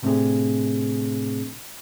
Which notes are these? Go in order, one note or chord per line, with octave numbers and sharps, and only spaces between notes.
A2 C3 A3 C4 D4 G#4